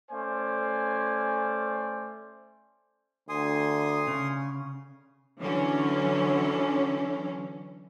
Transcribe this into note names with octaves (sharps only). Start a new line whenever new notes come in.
A3 C#4 C5 D5 G#5
D2 G#5 C6 D#6
C#3
D3 E3 F#3 C#4 C#5